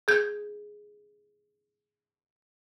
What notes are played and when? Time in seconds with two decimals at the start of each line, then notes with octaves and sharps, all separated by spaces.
0.08 G#4 G6